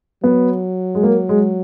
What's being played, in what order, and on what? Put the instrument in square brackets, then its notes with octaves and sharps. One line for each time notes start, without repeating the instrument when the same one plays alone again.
[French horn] F#3 [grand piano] B3
[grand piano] G#3
A#3
G#3